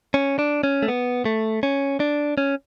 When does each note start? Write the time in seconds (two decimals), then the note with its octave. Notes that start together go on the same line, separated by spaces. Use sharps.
0.14 C#4
0.39 D4
0.63 C#4
0.83 A3
0.88 B3
1.25 A3
1.63 C#4
2.00 D4
2.38 C#4